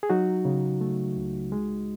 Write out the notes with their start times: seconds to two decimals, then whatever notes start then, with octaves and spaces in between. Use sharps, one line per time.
0.03 G#4
0.10 F#3 D#4 F#4
0.45 C#3
0.81 A3
1.17 C#2
1.52 G#3